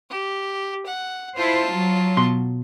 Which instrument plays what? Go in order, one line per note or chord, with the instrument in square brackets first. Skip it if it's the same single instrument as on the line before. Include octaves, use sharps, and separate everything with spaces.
[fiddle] G4
F#5
[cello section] E4 C5 [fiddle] F4 A5
[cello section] F#3
[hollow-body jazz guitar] B2 C6